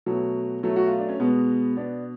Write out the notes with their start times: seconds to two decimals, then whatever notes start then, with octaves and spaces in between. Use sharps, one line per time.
0.06 B2 F#3 A3
0.63 F#3 A3
0.76 F#4
0.88 F4
0.99 D4
1.09 C#4
1.20 B2 G#3 B3
1.77 B3 D4